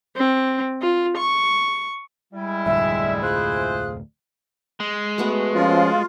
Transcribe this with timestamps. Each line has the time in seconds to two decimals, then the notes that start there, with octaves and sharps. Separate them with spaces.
0.16 C4
0.81 F4
1.17 C#6
2.33 G3 G#3 E4
2.66 F1 D2 A2 E5
3.22 F4 G#4 C5 F#6
4.80 G#3
5.18 A3 B3 F#4
5.54 F3 C#4 F4